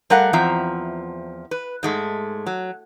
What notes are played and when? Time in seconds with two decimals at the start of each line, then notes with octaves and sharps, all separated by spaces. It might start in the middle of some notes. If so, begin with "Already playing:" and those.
0.10 G3 A3 A#4 F5 F#5
0.33 E2 F3 C4 E5 A#5
1.51 B4
1.83 G#2 G#3 A3
2.46 F#3